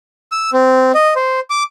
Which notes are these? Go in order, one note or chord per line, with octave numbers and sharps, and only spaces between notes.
E6
C4
D#5
C5
D6